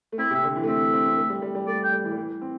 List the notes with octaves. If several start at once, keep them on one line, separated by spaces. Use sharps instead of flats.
A3
C4 E4
C3
E5
D3
E3
A3
C4 E5
C4
C4
A3
G3
G3
G3
A3 D5
G5
G3
E3
G3
E3
C4